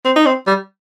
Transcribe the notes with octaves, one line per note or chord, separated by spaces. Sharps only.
C4
D#4
C4
G3